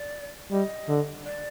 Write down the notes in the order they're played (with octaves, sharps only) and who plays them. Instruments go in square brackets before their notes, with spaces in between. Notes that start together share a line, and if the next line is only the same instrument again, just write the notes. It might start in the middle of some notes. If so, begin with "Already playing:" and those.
Already playing: [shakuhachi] D5
[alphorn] G3 [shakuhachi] D#5
[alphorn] D3
[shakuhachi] D5